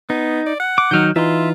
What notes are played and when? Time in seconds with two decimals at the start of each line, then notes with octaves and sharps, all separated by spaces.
0.10 B3 D#4
0.46 D5
0.60 F#5
0.78 D6
0.91 D#3 F#3 D#4 F6 G6
1.16 E3 D#4 F4 E5 C6